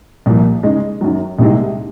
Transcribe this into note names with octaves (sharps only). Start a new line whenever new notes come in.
C2 A#2 F3
C#3 G#3 D#4
F#2 D#3 F#3
C2 C3 D#3 G#3